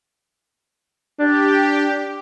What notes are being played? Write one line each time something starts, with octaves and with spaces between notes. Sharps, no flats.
D4 G4